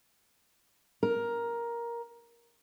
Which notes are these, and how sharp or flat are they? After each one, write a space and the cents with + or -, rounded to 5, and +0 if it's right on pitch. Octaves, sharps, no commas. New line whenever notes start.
A#4 +10